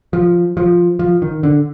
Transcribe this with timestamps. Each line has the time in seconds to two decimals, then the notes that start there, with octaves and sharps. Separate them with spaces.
0.13 F3
0.57 F3
0.99 F3
1.22 D#3
1.43 D3